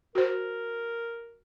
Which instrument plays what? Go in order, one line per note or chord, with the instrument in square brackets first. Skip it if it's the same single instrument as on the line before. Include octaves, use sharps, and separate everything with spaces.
[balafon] F#4 C5 [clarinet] A#4